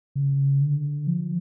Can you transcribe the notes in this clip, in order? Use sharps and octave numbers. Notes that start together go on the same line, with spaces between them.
C#3
D3
F3